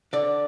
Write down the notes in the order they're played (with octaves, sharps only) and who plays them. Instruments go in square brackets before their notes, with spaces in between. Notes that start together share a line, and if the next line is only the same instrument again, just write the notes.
[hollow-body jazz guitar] D3 D5